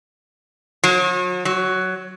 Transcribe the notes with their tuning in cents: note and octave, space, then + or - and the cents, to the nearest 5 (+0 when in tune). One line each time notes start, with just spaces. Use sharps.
F#3 -40
F#3 +10